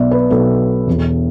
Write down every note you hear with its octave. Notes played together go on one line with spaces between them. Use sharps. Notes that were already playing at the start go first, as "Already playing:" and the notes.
Already playing: B1 B2 D5 E5
B4
B1 B2 A4
E1 E2 B2